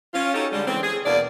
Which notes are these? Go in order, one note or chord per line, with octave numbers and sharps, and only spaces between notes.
C#4 F4
C#4 D#4 F#4 G4 A4 C#5
D3 G3 G#3
C#3 E3 B3 C4
G#4
E2 B2 A#3 D5